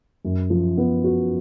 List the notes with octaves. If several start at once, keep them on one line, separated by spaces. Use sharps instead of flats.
F#2
F3
B3
F#4